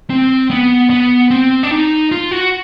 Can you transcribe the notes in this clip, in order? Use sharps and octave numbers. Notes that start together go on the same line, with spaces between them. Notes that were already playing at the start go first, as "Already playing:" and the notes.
C4
B3
B3
C4
D4
D#4
F4
F#4